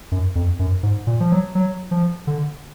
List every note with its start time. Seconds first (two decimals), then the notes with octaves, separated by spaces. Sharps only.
0.12 F#2
0.35 F2
0.59 F#2
0.83 G#2
1.07 A#2
1.20 F3
1.32 F#3
1.55 F#3
1.91 F3
2.27 D3